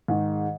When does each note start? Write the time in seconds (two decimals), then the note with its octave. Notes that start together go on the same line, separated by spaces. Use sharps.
0.08 G#2 D#3